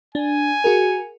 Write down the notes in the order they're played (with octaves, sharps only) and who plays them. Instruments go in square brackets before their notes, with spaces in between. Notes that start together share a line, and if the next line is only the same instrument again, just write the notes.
[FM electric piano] D4 [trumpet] G#5
[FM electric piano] F#4 G#4 A#4